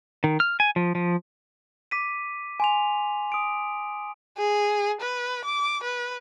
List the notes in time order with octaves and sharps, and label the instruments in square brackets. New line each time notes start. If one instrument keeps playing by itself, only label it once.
[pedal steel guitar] D#3
F6
G#5
F3
F3
[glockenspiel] D6 B6 D#7
G#5 C6 F7
D#6 D7
[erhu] G#4
B4
D6
B4